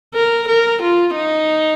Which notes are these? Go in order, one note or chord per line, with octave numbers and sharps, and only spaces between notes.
A#4
A#4
F4
D#4